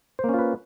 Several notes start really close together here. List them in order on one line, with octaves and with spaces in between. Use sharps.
C5 A#3 C#4 F4 B4